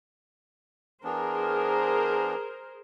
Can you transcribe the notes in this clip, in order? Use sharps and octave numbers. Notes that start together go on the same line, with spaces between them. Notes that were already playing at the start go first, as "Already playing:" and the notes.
E3 B3 D4 G#4 A#4 C5